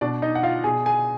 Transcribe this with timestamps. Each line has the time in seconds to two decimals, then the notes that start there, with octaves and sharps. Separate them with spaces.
0.01 B2 D4 D5
0.22 D#4 D#5
0.35 F#5
0.43 F4 F5
0.64 B2 G#4 G#5
0.85 G#4 G#5